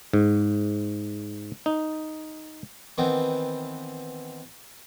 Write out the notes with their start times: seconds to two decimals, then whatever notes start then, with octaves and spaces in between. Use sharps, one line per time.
0.13 G#2
1.66 D#4
2.98 D#3 E3 B3 C4